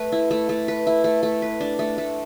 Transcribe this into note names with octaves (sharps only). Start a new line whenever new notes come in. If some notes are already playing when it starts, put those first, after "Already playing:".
Already playing: A3 B4
E4
A3
A3
B4
E4
A3
A3
B4
D4
A3
A3